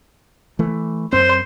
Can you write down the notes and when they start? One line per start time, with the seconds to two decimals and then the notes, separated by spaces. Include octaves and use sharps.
0.59 E3 A3
1.13 F#2 C4 C5